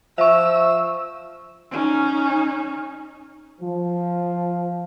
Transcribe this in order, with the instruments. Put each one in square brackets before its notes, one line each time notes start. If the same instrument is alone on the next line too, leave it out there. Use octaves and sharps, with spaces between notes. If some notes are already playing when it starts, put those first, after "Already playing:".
[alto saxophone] F3 [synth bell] E5 C#6 [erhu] E6
[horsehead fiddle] C#4 D#4
[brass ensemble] F3